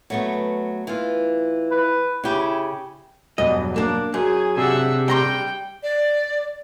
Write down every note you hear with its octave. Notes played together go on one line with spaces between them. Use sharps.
F#3 A3 B3
E3 F4
B4
C#3 E4 G4
E1 E2 G2 F#3 D#5
A#3 D4 E7
F#2 G#4 G#5
C3 D4 G4 G#4 E5 F#5
G3 G5 A#5 C6
D5